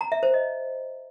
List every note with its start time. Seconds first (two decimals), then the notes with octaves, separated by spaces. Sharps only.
0.01 A#5
0.12 E5
0.23 C5
0.34 D#5